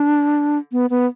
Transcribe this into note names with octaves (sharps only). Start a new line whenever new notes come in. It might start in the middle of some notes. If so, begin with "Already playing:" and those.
Already playing: D4
B3
B3